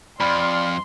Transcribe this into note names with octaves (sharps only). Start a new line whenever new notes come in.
F2 D5 B5 C6 F6